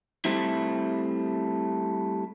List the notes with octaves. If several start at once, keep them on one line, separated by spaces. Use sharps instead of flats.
G3 A3 C4 E4